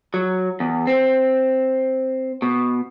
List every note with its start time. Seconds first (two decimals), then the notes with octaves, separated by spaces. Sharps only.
0.14 F#3
0.60 E2
0.87 C4
2.42 B2